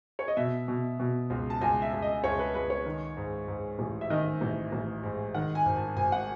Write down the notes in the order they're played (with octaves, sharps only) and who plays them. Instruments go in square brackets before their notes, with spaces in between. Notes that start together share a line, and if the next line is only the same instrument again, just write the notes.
[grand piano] C#5
D#5
B2 E5
B2
B2
C#2
A5
C#2 G#5
E5
C#2
D#5
C#2 C#5
B4
C#2 B4
C#5
D#3
G#2
G#2
A1
E5
D#3 D#5
A1
A1
G#2
D#3 F#5
G#5
G#1
A5
G#1 G#5
F#5